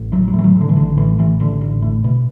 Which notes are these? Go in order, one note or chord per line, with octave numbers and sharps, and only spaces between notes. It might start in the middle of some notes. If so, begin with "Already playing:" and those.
Already playing: A1
A2 F#3
F#3
A2
E3
F#3
A2
D3
E3
A1 D3
A2 E3
A1 E3
A1 D3
A1
A2
B2